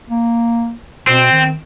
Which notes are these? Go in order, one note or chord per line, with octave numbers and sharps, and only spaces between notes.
A#3
B2 C4
D#3